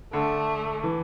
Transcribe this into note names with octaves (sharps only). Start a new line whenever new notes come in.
D3 A3
E3